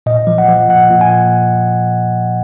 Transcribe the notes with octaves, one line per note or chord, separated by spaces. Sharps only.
A#2 D#5
F3
F#5
F3
A#2 F#5
A#2
G#5